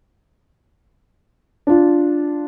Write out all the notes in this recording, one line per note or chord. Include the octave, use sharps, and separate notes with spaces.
D4 F4